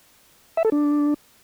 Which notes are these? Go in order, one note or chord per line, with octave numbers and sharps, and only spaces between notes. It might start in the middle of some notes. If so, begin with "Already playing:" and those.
E5
A4
D4